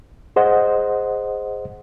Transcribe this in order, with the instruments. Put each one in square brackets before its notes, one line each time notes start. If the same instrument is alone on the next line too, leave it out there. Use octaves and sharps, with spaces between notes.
[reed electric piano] G#4 C5 D#5 F#5